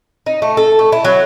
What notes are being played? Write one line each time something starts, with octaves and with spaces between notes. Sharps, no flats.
D#4
A3
A4
A3
E4
F#3